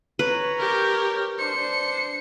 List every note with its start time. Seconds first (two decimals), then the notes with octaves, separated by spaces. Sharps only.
0.19 B4 C#5 A#5
0.59 G4 A#4
1.39 D4 C5 C#7